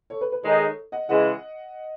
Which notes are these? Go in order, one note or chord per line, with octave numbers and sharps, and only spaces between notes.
A4 C#5
B4
B4
D#3 G#3 D#4 G#4 A4 C#5
D#5 F#5
C#3 E3 G#3 D#5 F#5